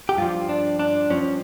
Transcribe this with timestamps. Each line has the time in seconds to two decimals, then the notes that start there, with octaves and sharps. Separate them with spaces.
0.09 G4
0.18 G2 F3 F4
0.49 D4
0.79 D4
1.10 G2 F3 C#4